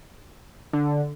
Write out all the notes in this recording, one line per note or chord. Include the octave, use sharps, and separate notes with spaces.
D3